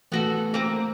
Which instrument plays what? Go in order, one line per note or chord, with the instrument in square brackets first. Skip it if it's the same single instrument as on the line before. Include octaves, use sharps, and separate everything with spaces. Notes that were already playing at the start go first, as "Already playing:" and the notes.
[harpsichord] A1 [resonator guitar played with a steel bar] B3 F#4 A4
[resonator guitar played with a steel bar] A#3 C4